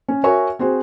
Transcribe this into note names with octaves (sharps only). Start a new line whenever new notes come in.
C#4
F#4 A#4 C#5 E5 G#5 C#6
C4 F#4 G#4 C5